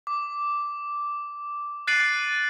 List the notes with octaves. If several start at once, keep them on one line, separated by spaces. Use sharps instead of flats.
D6
F#6 A6 C7 D7 D#7 F#7